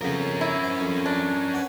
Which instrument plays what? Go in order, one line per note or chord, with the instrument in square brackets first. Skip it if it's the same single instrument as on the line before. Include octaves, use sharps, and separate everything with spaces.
[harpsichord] F2 C#3 B3 [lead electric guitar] C#4 A#4
[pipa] E4
[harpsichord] C5
F2
[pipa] D4
[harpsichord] B4 C#5 F#5